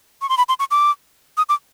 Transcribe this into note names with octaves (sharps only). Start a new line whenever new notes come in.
C#6
C6
B5
C6
C#6
D6
D#6
D6